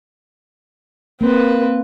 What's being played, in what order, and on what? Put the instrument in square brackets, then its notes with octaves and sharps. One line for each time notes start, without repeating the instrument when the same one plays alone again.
[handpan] A#3 [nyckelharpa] C4 B4